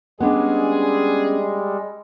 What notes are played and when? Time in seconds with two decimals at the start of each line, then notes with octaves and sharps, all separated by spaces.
0.20 G3 G#3 B3 C#4 D4 G#4